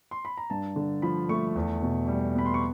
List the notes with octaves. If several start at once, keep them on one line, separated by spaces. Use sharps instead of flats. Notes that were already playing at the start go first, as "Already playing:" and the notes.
C6
B5
A#5
G2 A5
D3
F3 B5
A3 C#6
E2
B2
G3
B3 B5
C6
C#6